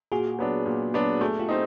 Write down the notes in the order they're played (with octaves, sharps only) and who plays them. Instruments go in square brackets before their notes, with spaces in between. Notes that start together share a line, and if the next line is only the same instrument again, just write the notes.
[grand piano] A#2 [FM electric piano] F#4 G#4
[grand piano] F#3 B3 D4
A#2
F#3 B3 D4
[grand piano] A3 [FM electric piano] F#4 G#4
[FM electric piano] F4 G4
[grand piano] C4 D#4